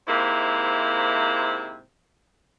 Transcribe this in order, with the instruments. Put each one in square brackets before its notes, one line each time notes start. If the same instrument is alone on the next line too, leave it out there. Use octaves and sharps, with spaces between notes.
[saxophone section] G#2 C3 A#3 E4